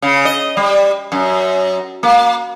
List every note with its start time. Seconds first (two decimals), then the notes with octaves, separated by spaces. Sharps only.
0.02 C#3
0.25 D#5
0.57 G3
1.12 F#2
2.03 A#3